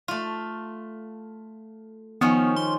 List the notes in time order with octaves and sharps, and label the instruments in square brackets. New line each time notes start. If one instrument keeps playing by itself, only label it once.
[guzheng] A3 F4
[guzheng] D#3 F3 C#4 [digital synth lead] B3
[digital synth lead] C6